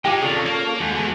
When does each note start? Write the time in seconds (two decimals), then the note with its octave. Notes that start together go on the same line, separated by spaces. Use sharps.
0.05 G#3 D#4 F4 G4 G5
0.22 C3 D#3 C#4 F4 G#4 A4 D5
0.46 A#3
0.80 D#2 G#3 A3 F#4
0.95 E2 E3